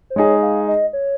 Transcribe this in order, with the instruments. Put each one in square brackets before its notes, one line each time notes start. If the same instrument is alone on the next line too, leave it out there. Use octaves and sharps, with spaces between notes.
[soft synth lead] C5
[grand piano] G#3 D#4 G#4 [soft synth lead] C#5
[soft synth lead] F5
D#5
C#5